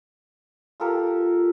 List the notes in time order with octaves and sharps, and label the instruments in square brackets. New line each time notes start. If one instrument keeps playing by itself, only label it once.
[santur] F4 G4 A4 A#4